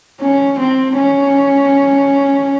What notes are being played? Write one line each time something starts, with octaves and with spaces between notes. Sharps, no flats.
C#4
C4
C#4